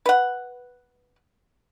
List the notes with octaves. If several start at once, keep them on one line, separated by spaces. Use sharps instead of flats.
B4 F#5